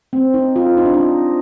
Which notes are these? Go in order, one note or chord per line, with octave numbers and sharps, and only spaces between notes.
C4
D#4
F4
D#4
D4
D#4